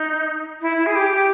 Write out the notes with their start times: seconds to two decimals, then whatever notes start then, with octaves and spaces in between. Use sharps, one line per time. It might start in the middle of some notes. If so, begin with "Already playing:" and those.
Already playing: D#4
0.61 E4
0.78 E4
0.86 G#4
0.95 G4
1.11 G4